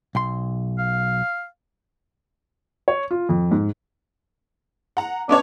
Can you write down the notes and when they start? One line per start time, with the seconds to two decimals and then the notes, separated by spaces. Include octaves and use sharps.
0.15 B1 C6
0.78 F5
2.88 C#5
3.11 F4
3.29 F2
3.51 G#2
4.97 F#5 A#5
5.29 B3 C#4 D4 C#5